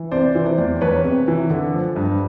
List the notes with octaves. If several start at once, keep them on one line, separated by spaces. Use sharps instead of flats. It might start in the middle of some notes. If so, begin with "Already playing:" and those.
Already playing: E3
C3 C5 D5
E3
C5 D5
E2
E2 B4 C#5
C3
E3
D3
F3
G2